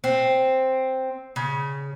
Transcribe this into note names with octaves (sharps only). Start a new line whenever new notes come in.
C4
C#3